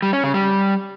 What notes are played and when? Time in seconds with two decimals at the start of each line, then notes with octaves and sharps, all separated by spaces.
0.02 G3
0.13 C#4
0.24 C#3
0.34 G3